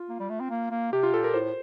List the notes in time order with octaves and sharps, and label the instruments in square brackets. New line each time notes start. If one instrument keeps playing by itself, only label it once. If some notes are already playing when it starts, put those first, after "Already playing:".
Already playing: [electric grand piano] F4
[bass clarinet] A#3
G3
A3
C4
A#3
A#3
[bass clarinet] C3 [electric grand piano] G4
[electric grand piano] F4
[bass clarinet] A#2 [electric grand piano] A4
[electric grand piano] A#4
[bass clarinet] A2 [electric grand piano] C5